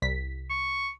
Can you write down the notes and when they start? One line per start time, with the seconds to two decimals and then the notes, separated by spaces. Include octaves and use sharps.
0.02 C2 B6
0.50 C#6